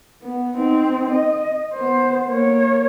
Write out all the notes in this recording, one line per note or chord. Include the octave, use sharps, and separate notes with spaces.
B3
C4 D#4
D#5
B3 C5
A#3 C#5